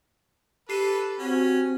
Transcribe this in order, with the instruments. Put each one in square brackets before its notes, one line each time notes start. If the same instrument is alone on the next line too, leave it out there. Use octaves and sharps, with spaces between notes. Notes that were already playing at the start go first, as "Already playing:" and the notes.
[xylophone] G4 C7 D#7 [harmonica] A4 B4
[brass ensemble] C4 F#4 [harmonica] C#4